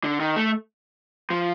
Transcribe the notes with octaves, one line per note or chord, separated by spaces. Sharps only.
D3
D#3
A3
F3